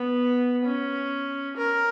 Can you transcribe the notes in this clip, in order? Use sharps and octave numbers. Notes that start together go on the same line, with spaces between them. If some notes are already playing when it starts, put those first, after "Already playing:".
Already playing: B3
C#4
A#4